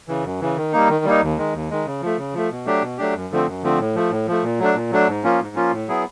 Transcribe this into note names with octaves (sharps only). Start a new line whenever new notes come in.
C#3 E3
F#2
C#3 E3
D#3
G3 A#3 D#4
D#3
G3 A#3 D#4
D#2
D#3 G#3
D#2
D#3 G#3
C#3
F3 A3
C#3
F3 A3
B2
F#3 A3 D4 G4
B2
F#3 A3 D4 G4
F#2
D3 F3 A3 C4
F#2
D3 F3 A3 C4
A2
F3 A3
A2
F3 A3
A#2
F#3 A3 D4
A#2
F#3 A3 D4
G#2
F3 A#3 C#4 F4
G#2
F3 A#3 C#4 F4
A2
F#3 B3 E4 G#4